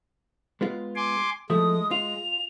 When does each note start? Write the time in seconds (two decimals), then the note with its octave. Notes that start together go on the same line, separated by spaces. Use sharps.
0.61 G#3 B3 F4
0.96 G#5 C6 D6
1.50 F3 G#3 A3 E4 D#6
1.91 F4 F7